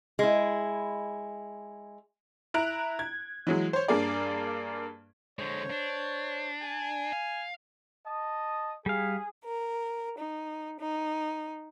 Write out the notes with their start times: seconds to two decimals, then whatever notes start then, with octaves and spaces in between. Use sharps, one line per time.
0.19 G#3 E4
2.54 E4 A#5 F#6 D7
2.99 G#6
3.47 E3 F#3 G#3
3.73 C5 C#5
3.88 G2 A#3 G#4 D5
5.39 D3 G#3 C5 C#5
5.70 D4
6.62 G#5
7.13 F5
8.07 D#5 A5 D#6
8.86 G3 G#4 F5
9.44 A#4
10.16 D#4
10.79 D#4